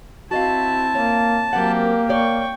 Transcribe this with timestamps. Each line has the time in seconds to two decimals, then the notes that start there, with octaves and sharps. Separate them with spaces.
0.31 C4 E4 F#4 D#5 F5 A5
0.95 A#3 C#5
1.53 F#3 A#3 C4 G4 A#4 F#5
2.09 C#5 D5 G5 C#6